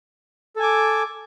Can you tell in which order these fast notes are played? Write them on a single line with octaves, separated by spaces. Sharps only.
A4 G#5 D6